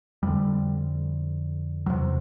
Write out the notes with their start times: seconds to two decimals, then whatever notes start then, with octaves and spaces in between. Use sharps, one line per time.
0.23 F2 D3 G3
1.86 E2 C3 F#3